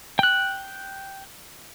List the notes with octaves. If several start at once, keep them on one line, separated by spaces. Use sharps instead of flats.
G5 F#6